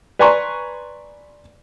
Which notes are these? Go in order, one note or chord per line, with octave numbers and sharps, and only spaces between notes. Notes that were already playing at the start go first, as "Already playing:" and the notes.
B4 D5 G#5 A#5 C6 C#6